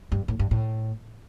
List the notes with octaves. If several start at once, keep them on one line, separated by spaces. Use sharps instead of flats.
G2
A2
G2
A2